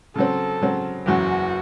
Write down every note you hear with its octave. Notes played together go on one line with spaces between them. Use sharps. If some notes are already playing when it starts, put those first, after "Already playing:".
C#3 F#3 C4 A4
C#3 F#3 C4
F#1 E2 C#3 F#3 F#4